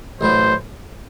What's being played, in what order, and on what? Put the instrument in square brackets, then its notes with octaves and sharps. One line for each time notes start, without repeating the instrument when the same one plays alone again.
[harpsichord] A1 A2 F#3 [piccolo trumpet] C5